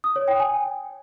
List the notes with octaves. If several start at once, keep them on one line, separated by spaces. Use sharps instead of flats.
D#6
C#5
G5
G#5